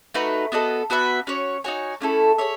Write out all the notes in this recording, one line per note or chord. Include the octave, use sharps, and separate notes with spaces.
A3 D#4 F#4 B4
B3 F#4 A4 D#5
B3 F#4 B4 E5
C#4 F#4 C#5
D#4 F#4 C#5 G#5
A3 C#4 E4 A4
G#4 C#5 E5